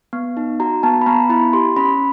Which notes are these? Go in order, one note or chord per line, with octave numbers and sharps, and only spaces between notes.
B3
D#4
F#4 A#5
B3 A5
B5
B3 A#5
E4 B5
G4 C6
C#4 B5